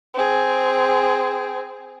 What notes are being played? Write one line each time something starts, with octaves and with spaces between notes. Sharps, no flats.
C4 G#4